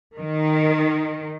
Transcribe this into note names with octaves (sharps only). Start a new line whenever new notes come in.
D#3